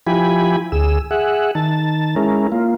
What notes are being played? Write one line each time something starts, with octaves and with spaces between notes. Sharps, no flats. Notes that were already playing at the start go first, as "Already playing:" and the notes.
F3 E4 G4 G#5 B5
D2 G#4 E6
G#4 E5 F#5
D#3 A5
G#3 C#4 E4 A#4
A#3 F4